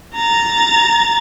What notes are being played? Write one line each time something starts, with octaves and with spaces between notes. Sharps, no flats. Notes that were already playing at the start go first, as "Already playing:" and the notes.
A#5 A6